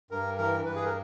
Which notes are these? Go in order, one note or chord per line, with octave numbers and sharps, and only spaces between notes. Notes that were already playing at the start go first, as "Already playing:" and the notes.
G2 A#4
E3 A#4
G2 B4
G#4
A#4